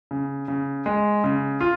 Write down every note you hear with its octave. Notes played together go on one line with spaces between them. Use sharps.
C#3
C#3
G#3
C#3
F4